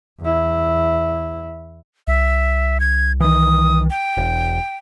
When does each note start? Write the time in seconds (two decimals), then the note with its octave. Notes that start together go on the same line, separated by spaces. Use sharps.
0.21 E2 E4
2.07 C2 E5
2.80 G#6
3.20 D#3 E3 D#6
3.90 G5
4.17 E1